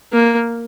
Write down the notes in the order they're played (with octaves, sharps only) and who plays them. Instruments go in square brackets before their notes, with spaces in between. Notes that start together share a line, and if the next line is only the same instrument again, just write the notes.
[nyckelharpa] A#3